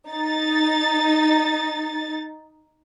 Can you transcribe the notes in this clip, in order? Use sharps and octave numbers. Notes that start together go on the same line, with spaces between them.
D#4 A6